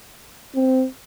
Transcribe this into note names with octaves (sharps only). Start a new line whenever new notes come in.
C4